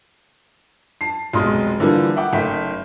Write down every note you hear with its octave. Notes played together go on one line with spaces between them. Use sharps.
A5 C7
F1 B1 G#3 D#5 C6 F6
D3 E3 F3 G3 A#3
E5 F#5 G5 D6
F#1 A3 D#4 G5 B6